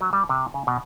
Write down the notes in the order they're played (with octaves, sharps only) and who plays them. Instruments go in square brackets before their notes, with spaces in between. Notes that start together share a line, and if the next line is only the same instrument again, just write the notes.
[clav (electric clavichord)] F#3
G3
C3
C#3
B2